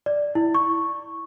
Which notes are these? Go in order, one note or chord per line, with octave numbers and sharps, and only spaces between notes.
D5
E4
C#6